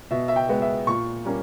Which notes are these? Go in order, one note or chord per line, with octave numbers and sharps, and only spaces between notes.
B2 E5
E5
G5
G#3 B3
E5
A#2 C#6
G3 A#3 C#4